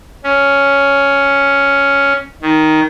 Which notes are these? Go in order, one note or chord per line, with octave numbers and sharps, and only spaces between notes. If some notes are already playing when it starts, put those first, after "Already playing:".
C#4
D#3